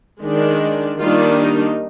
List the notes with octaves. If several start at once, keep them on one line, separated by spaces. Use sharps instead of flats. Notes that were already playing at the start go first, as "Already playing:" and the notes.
D#3 G#3 D4
D#3 G3 A#3 D4 F4
D#4